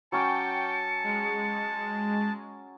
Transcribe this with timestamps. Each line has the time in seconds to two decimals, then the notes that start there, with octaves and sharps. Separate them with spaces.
0.12 F#3 C#4 G5 A5 D6 C#7
1.03 G#3